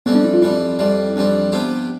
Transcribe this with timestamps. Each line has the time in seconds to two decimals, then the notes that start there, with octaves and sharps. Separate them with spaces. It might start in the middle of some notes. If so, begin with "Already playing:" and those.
0.06 F2 E3 G3 B3 C4
0.15 D4
0.24 E4
0.34 F4
0.42 F2 E3 G3 C4 E4
0.79 F2 E3 G3 C4
1.16 F2 E3 G3 C4 D4
1.52 C3 F3 B3 E4 G4